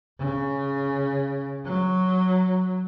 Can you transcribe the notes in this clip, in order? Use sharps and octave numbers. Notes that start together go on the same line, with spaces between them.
C#3
F#3